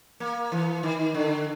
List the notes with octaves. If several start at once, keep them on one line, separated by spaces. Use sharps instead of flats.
A#3
E3
D#3
D3